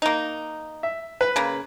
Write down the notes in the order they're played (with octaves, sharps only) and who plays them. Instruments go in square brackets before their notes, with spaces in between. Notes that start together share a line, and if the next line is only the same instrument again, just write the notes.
[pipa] A#3 D#4
[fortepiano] E5
B4
[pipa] C#3 A#3